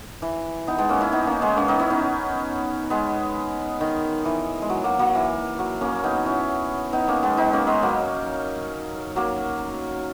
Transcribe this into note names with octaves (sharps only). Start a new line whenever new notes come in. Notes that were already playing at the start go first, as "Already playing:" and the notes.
E3
B3 D#4
G#3 B3
A#3 C#4
C#4 E4
B3 D#4
A#3 C#4
G#3 B3
A#3 C#4
B3 D#4
C#4 E4
B3 D#4
G#3 B3
D#3
E3
G#3
F#3
F#3 A#3
F#3 A#3
E3
F#3
A#3 C#4
B3 D#4
C#4 E4
B3 D#4
A#3 C#4
G#3 B3
B3 D#4
A#3 C#4
G#3 B3
F#3 A#3
F#3 A#3